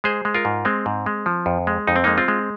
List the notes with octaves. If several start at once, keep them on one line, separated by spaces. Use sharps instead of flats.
G#3 G#4 C5
G#3
F4 A#4
G#2
G#3 C4
G#2
G#3
F3
F2
G#3
F2 D#4
C4
G#3 A#3 D#4
C4 F4
G#3